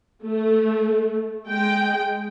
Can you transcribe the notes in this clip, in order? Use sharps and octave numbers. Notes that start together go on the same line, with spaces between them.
A3
G#3 G5